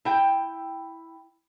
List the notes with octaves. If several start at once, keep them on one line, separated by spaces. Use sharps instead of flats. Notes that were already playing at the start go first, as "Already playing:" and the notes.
E4 G5